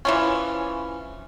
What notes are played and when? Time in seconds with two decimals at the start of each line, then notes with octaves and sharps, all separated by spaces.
0.05 E3 F3 C#4